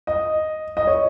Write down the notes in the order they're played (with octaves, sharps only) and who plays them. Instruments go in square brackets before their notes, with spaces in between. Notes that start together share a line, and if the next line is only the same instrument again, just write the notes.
[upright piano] D#5
D#5
C#5